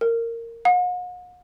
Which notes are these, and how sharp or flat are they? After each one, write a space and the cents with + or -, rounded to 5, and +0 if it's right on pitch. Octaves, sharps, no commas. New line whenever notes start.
A#4 -15
F#5 -45